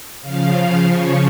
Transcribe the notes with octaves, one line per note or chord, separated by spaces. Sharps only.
C#3 F3 F5
F5
C#5